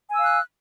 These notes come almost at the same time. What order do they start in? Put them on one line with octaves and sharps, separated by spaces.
G#5 E6 F5 F#6